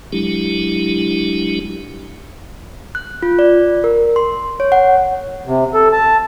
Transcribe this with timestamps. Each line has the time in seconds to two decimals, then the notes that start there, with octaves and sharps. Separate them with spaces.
0.13 F#3 G#3 D4 E4 G4
2.95 F#6
3.22 F4
3.39 D5
3.84 A#4
4.16 C6
4.60 C#5
4.72 F#5
5.47 C3
5.74 A4
5.92 A5